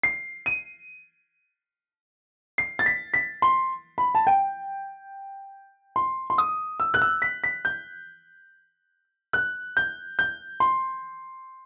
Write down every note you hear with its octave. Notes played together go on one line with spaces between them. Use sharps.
C7
D#7
C7
A6
B6
B6
C6
B5
A5
G5
C6
C6
D#6
E6
F#6
E6
B6
B6
G6
F#6
G6
G6
C6